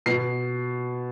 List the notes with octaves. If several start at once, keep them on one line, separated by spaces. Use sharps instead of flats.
B2 C7